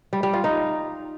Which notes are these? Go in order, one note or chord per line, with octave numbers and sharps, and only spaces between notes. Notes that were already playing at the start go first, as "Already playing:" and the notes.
G3
G3
F4
D#4